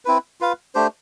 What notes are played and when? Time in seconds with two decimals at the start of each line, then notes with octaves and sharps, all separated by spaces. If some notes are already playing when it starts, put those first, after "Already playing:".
0.05 C4 E4 B4
0.41 F4 B4 F5
0.75 A3 D4 G4 C5